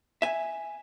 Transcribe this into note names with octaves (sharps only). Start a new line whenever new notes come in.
E5 G#5